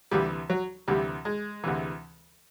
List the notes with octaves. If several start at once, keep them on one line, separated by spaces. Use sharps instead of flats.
D2 C3 E3 G3
F#3
D2 C3 E3 G3
G#3
D2 C3 E3